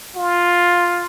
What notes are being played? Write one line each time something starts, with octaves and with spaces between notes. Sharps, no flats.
F4